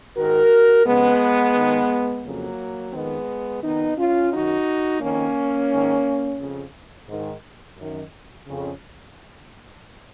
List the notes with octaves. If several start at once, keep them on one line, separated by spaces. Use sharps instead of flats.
G#2 D#3 F#4 A#4
F2 C#3 G#3 B3
G#2 D#3
F2 C#3 F#3 A#3
F2 D#3 G#3 B3
F2 D#3 B3 D#4
C#4 F4
F#2 D#3 D#4 F#4
F2 D#3 A#3 C#4
G#2 D#3
F2 C#3
G#2 D#3
F#2 D#3
F2 C#3